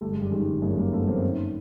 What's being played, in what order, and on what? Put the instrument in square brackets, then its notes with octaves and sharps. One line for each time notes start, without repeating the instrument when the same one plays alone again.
[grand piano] G1 G3 A3
G#3
F#2 G3
D#3 G#3
G1
F#2 G#3 A#3
G1 G#3 A#3
G1 A3 B3
F#2 A#3 C4
D#3